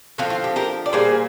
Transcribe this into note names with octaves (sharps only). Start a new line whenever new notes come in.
D3 F3 C4 F4
F4
G4
G4 A#4
D5
A#2 G3 A#3 G#4 C5